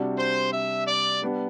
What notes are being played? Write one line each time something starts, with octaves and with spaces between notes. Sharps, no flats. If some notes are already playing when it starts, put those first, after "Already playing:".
Already playing: C3 G3 D4 F#4
C5
E5
D5
G3 B3 D4